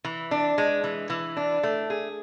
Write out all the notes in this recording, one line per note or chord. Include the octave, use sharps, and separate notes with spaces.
E3
D4
G#3
E3
E3
D4
A3
G#4